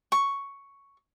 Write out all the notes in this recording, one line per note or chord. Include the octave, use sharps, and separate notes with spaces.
C#6